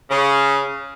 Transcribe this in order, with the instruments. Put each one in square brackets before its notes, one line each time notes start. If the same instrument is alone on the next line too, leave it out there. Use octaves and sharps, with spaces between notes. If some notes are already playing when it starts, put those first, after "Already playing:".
[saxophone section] C#3